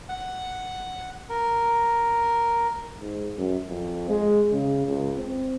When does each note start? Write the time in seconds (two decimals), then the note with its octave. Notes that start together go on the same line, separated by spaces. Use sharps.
0.09 F#5
1.29 A#4
3.01 G#2
3.38 F#2
3.68 F2
4.09 G#3
4.52 C#3
4.87 C#2
5.17 C4